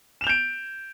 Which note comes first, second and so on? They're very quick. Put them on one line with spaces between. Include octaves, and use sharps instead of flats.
E7 F7 G6 D7